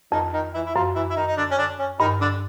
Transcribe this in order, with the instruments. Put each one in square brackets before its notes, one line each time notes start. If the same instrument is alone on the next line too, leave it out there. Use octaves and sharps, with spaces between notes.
[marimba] F2 [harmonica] D#3 D#4
[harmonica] D#3 D#4
E3 E4
E4
[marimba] F#2 [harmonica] F3 F4
[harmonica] E3 E4
E4
D#3 D#4
D#4
D3 D4
C#4
D3 D4
C#4
[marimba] G2 [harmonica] D#3 D#4
[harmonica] D3 D4